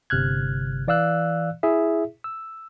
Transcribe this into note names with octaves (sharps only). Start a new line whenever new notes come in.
G1 C3 F6 F#6 G#6
E3 D5 F5 E6 F#6
E4 G#4 E5
E6